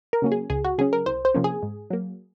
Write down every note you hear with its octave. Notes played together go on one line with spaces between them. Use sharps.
A#4
C#3 F#3 A#3 C#4
G#4
C#2 G#4
F#4
C#3 F#3 C#4 G#4
A#4
C2 C5
C5
C3 F3 A#3 C#4
G#4
G#2
F#3 A#3